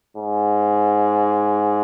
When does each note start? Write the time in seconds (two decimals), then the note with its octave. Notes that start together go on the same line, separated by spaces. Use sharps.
0.17 G#2